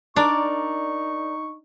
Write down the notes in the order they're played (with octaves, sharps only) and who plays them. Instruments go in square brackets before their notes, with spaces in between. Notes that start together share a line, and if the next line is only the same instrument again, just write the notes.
[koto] D4 [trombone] D#4 [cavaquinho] A#4 D5 [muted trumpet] C#6